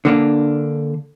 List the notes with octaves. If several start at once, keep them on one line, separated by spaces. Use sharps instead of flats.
D3 A#3 D4